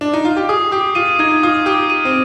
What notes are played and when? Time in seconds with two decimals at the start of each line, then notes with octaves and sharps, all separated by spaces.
0.01 D4
0.13 D#4
0.25 F4
0.36 G4
0.49 G#4 D#6
0.72 G4 D#6
0.95 F4 D#7
1.19 D#4 G#6
1.43 F4 D#6
1.66 G4 D#6
1.90 D#7
2.05 C4